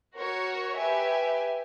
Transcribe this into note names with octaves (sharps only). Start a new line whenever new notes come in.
F#4 A#4 C#5
G4 B4 E5 G#5